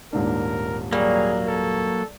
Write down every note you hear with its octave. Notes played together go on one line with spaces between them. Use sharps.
D#1 G#2 D4 A#4
F#3 G3 A#3 G#4
A4